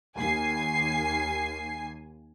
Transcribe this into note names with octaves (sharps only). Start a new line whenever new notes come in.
D#2 G#5 C7